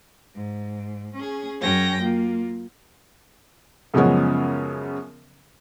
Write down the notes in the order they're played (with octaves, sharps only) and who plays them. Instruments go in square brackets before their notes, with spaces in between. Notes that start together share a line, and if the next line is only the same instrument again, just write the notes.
[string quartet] G#2
C#4 G#4
F#2 C#4 C#5 G5 A#6
A#3 F4
[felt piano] F#2 C#3 F3 G#3 B3 C#4